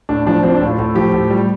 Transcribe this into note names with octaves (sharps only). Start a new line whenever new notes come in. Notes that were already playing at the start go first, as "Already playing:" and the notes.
A2 D4
F3 D4
F3 C4
D4
A2
F4
A2 A4
F3 G4
A2
G3